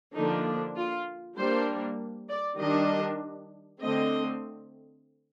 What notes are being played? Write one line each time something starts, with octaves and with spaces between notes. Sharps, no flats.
D3 F3 A#3 D4 D#4
F4
G3 A#3 D4 C5
D5
D#3 G3 D4 D#5
D3 A3 C4 D#5